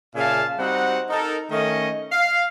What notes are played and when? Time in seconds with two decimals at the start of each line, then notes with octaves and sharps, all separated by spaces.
0.16 A#2 C#3 E5 F5 G#5 A5
0.58 G3 C4 D#4 F#4 F#5
1.10 D#4 A4 A#4
1.51 D#3 A3 C#4 D#5
2.12 F5